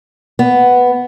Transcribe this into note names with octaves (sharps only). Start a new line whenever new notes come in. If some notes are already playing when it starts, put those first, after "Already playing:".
B3